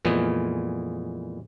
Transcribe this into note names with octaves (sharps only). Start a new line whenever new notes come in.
F2 A#2 E3 G#3 B3